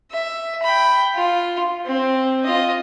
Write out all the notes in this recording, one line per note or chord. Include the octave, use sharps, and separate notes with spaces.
E5
G5 B5
F4
C4
F4 D#5